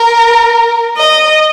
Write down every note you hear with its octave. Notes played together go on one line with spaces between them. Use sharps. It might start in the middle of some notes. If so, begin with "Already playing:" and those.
Already playing: A#4
D#5